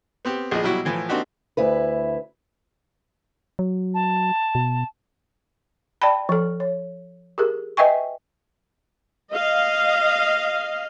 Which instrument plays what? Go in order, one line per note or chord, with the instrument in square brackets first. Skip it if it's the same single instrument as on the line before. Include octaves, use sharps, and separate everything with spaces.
[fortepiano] B3 C4 G4
A#1 F3 G#4 D#5
B2 F#3 G3 E4 F#4
A2 E3 F3
A#3 C4 D4 D#4 F#4 G4
[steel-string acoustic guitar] D2 E4 B4
[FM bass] F#3
[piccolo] A5
[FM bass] B2
[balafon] D5 G5 A5 B5
F3 A4
C#5
G4 G#4 A#4
B4 D#5 E5 G5 G#5 C#6
[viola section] D#5 F5